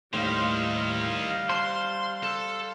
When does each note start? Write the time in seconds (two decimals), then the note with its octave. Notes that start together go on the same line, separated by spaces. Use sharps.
0.13 D#2 A2 D#3 G3 A#3 C5 F5
1.49 C5 F#5 A5 C6
2.23 A4